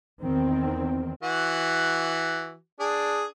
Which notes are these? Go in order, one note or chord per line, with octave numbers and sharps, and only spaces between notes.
E2 D#3 C4
E3 F#4
D4 G#4